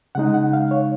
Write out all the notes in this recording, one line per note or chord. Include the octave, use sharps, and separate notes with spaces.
C#3 G#3 D#4 F#5
F#5
F5
C#5